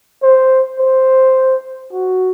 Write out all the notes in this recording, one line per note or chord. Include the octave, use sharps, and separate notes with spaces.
C5
C5
F#4